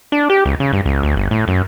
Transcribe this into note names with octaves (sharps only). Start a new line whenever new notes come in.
D4
G4
C#2
C#3
G2
C#2
D2
G1
A2
F#2